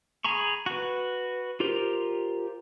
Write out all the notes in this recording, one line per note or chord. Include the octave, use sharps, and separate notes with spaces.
G#4 G#5 A#5 B5 C#6
F#4 B4
F4 G4 A#4 C5